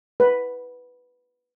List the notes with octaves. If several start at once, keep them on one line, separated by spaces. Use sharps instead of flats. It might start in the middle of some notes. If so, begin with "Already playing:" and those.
B4